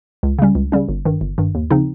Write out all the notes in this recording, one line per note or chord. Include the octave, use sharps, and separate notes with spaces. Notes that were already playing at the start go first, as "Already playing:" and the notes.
C#2
C#3 G3 C#4
C#2
C#3 G3 C#4
G1
G2 D#3
G1
G2 D#3
D#2
C#3 F3 C4 D#4